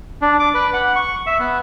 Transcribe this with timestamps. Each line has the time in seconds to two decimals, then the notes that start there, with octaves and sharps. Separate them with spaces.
0.22 D4
0.40 D6
0.54 B4
0.73 F#5
0.96 C#6
1.26 E5
1.39 B3